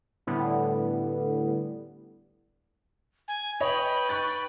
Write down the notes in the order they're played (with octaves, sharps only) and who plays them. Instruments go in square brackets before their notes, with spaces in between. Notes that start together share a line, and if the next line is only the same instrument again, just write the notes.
[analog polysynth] A2 D3 G3 B3
[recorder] G#5
[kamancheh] B4 G5 [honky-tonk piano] C#5 D#5 [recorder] B5
[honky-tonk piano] C#6 F#6 A6